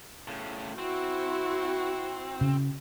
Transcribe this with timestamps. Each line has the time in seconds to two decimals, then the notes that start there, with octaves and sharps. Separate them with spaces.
0.28 A2 C#3
0.78 C4 E4 F#4
2.41 C#3